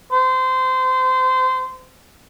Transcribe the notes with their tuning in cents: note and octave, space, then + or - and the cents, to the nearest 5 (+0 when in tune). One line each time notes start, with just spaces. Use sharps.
C5 -25